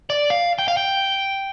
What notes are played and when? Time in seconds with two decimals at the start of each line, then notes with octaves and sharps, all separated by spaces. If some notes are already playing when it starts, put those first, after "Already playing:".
0.10 D5
0.30 F5
0.59 G5
0.68 F5
0.77 G5